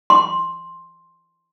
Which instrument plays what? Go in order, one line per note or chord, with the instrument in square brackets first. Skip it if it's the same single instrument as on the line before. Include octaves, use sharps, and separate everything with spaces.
[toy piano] C6